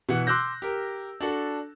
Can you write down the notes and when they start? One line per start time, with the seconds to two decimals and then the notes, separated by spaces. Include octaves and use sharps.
0.09 B2 E3 F#5
0.27 C6 D6 E6 F#6 G6 A#6
0.62 G4 A#4
1.20 D4 F#4 A4